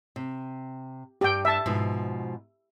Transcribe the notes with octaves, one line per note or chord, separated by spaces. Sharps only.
C3
G2 G3 G4 G5
E5 A5
G#2 B2 F3